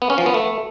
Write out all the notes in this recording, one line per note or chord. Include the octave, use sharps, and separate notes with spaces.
B3
C#4
F3
B3
A3